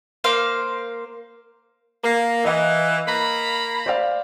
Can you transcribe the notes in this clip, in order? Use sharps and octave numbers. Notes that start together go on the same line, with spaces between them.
A#3 C5 F5
A#3
E3 D#5 F5
A#3 A#5 B5
C5 D5 F5